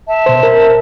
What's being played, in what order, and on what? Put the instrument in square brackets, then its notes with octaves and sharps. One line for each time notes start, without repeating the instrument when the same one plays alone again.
[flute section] E5 A5
[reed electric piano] B2 C5
A#4